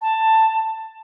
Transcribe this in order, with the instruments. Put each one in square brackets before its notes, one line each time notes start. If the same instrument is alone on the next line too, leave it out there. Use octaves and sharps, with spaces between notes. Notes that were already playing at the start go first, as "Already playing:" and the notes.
[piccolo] A5